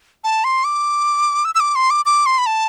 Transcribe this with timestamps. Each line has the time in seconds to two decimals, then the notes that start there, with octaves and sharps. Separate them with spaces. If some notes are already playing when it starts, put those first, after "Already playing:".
0.24 A5
0.44 C6
0.64 D6
1.45 E6
1.55 E6
1.60 D6
1.75 C6
1.90 D6
2.06 D6
2.26 C6
2.38 B5
2.46 A5